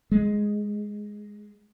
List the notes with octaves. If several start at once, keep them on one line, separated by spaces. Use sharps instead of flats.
G#3